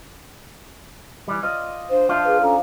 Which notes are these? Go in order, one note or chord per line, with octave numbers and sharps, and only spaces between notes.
E3 G3
F4 D5 D#5
D4 C5 F5
F3 D4 F4 C5 E5
G#4 B4 F5
C#4 A4 A#5